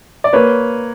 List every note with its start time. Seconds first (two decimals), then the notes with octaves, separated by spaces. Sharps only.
0.24 D5
0.33 A#3 B4 C#5